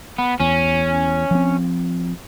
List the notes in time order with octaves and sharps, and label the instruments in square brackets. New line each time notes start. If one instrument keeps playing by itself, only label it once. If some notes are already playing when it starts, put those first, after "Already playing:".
[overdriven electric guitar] B3
[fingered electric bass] E2 [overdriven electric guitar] C#4
[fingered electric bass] F3 C4